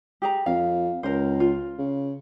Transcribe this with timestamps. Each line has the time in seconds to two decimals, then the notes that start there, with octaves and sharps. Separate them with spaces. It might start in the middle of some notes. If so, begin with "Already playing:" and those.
0.22 G4 G#4 A#5
0.46 F2 F5
1.03 C#2 A#4 C5
1.40 F4
1.78 C#3